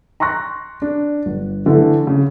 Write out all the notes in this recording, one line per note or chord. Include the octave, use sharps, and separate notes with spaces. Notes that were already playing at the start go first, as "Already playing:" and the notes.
A#5 C6 C#6 F#6 A#6
D4
G1
D3 E3 A3
C#3